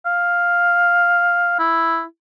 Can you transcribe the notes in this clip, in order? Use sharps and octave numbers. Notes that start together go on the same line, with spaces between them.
F5
E4